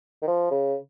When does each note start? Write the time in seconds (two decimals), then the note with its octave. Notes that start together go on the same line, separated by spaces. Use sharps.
0.22 D#3
0.28 F3
0.51 C#3